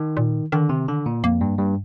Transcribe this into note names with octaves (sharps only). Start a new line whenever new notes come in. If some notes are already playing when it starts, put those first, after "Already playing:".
Already playing: D#3
A#2
D3 D#3
C3
D3
A#2
F2 A#3
G2
G2